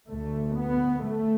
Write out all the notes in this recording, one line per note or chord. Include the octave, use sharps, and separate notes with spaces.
D2 A3
B3
A3